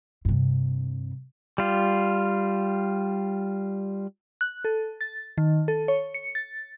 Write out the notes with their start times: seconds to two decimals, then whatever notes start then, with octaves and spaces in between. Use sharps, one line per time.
0.25 G2 C3
1.58 G3 F4
4.41 F#6
4.65 A4
5.01 A6
5.38 D#3
5.68 A4
5.88 C#5
6.14 C#7
6.35 A6